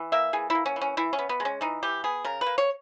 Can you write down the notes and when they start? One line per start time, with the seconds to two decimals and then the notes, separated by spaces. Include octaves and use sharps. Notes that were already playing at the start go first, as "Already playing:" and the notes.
Already playing: E3
0.12 A#3 E5
0.33 E3 G#4
0.50 E4
0.55 A#3
0.66 C#4
0.76 E3
0.81 C#4
0.97 E3 E4
1.13 C#4
1.18 B3
1.29 B3
1.40 G#3
1.45 C#4
1.61 E3 D#4
1.83 E3 G4
2.04 B3 G#4
2.24 C#3 A#4
2.41 B4
2.46 A#3
2.58 C#5